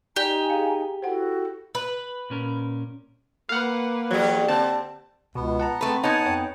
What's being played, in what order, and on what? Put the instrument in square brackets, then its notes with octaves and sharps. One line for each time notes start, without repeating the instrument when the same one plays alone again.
[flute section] D#4 G#5 A#5 [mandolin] G4 [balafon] D5
[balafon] G#4 F5
[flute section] E4 F#4 A4 [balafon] C5 F#5
[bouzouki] B4
[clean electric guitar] A#2 C#4 A#4
[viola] A#3 B4 [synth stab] F5 F#5
[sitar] E2 G4 [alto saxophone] F#3
[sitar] D3 [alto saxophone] C4 [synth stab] A5
[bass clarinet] C#2 [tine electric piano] B2 [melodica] B3
[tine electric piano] F#5 A5 A#5
[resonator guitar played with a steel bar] A3 B4 [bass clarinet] C4
[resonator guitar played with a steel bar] B3 D#4 [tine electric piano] C#5 G#6 [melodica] F#5 G#5 A5
[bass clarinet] F2 [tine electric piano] C#5 G5